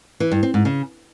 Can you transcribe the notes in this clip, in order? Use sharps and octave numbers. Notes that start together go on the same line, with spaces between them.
E3
G2
C4
G#2
C#3